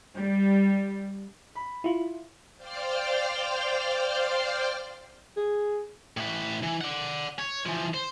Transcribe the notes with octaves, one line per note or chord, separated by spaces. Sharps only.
G3
B5
E4 F4
C5 D5 F5 G5 F6
G#4
A2 B4
E3
D5 F#5
C#5
E3 F3
C5